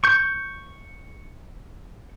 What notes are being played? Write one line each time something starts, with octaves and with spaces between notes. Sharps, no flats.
C#6 G6